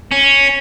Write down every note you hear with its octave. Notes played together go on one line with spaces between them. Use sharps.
C#4